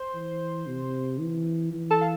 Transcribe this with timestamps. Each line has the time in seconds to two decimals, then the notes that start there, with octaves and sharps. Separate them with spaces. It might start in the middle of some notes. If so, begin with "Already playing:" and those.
Already playing: C5 C6
0.14 E3
0.67 C3
1.20 E3
1.74 E3
1.90 A4 A5
2.01 F5